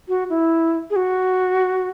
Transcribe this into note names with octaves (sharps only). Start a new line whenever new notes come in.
F#4
E4
G#4
F#4